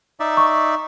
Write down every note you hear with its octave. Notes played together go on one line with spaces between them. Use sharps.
D#4 D5 E5
C#6